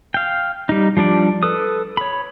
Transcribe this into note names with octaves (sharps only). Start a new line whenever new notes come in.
F5 G5
G3 D#4
F3 G3 D4 D5
A4 B4 D#6
C#5 B5